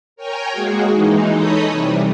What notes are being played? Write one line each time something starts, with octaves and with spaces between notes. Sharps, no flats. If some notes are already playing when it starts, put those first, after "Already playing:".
A#4 C#5 G5 G#5 A#5
G#3 A#3 F#4 G#4
E3 G#3 D#4
D#4 A4 C#5 D#5 B5 D#6
C3 E3 G3